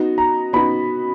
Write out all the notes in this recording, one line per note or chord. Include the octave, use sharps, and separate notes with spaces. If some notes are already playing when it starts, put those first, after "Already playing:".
Already playing: B3 D#4 F#4
A#5
B3 D#4 F#4 B5